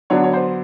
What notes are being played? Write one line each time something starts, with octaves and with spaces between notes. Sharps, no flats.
D3 F#3 B3 D4 C#5
C#5
C5